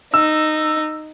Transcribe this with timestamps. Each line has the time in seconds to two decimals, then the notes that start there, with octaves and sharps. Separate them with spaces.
0.14 D#4 E6